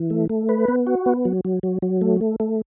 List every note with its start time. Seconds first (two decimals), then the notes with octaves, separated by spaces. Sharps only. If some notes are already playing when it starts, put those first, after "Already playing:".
Already playing: E3
0.10 A3
0.29 A3
0.49 B4
0.68 B3
0.87 F#4
1.06 B3
1.25 F#3
1.45 F#3
1.63 F#3
1.82 F#3
2.01 A3
2.21 A3
2.40 A3